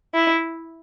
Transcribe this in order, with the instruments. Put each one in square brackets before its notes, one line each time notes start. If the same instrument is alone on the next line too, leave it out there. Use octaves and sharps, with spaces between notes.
[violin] E4